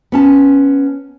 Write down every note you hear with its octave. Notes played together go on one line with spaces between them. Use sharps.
B3 C#4 A5